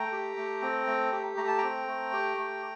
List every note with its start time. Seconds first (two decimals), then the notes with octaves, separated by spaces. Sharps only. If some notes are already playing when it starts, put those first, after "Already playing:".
Already playing: A3 G5 A#5
0.12 G4
0.37 A3
0.62 C4
0.87 A3
1.12 G4
1.37 A3 A#5
1.48 A5
1.58 C4 G5 A#5
1.88 A3
2.13 G4
2.38 A3